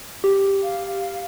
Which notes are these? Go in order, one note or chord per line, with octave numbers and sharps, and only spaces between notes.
G4
F5